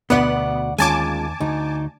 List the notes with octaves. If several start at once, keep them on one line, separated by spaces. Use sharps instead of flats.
D2 B2 B3 D5 F#5
D#2 G#3 C#4 F4 G#5 A5 D6
D2 D#4